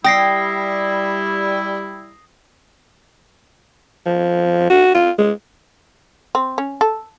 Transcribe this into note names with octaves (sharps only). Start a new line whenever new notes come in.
G3 E4 G5 D#6 A#6 C7
F3
F#4
F4
G#3
C4
C#4
A4